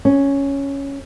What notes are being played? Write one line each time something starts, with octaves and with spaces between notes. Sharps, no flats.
C#4